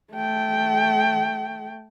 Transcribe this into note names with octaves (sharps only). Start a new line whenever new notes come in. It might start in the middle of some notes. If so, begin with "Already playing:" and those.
A3 G5